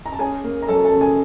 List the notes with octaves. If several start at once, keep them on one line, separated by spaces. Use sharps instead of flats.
A#5
A5
C#4 G#4 G#5
A#3
A#5
F#3 A4 A5
A4 A5
C#3
G#4 G#5